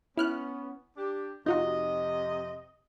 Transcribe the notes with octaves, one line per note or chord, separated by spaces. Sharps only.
B3 C#4 E4 F6 F#6
D4 G4
F2 C3 D#4 F4 F#4 D#5